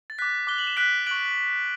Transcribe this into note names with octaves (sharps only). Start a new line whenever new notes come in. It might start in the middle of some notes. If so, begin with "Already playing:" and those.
A6
D6 F#6 B6
D6 F#6 G7
F#7
E7
D6 F#6 B6 D7
C#6 F#6 D7 F#7